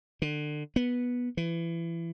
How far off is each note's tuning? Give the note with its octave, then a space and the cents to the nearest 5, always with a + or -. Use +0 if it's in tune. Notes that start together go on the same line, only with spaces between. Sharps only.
D3 +30
B3 -10
E3 +25